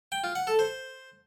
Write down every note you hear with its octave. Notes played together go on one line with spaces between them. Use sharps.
G5
F4
F#5
A4
C5